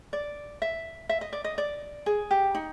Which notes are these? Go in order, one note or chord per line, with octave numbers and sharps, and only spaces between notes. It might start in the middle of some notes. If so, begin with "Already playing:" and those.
D5
E5
E5
D#5
D5
D#5
D5
G#4
G4
D#4